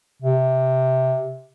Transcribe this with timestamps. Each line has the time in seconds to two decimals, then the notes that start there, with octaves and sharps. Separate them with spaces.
0.22 C3